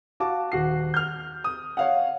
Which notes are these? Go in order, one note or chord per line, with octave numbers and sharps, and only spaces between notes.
F#4 F5 A5 D6
D#1 F#4 C7
F6 G6
D#6
C#5 F5 F#5